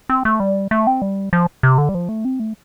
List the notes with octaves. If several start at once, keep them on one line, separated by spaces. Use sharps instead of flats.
C4
A3
G3
A3
C4
G3
F3
C3
D3
G3
F3
A3
C4
A3